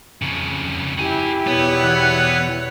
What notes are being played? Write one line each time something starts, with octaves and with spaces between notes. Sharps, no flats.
F2 C#3
E4 F#4 G4 G#5
E2 B2 B3 C#5
E3 F#5